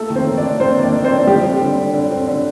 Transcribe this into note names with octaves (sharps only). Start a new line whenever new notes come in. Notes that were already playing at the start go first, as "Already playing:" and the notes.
Already playing: A3 A#3 A4
D#3
C4 C5
D#3
D4 D5
A#3
A#3 C4 C5
D#3
D4 D5
D4
C4 C5
D4
D3 G3 G4
C4
D3
D3
D3
C4
D3